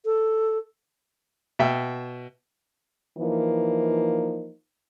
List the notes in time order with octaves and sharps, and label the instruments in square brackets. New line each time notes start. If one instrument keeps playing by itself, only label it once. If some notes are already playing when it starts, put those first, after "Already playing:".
[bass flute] A4
[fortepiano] B2 E5 G5
[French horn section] E3 F3 A#3 D#4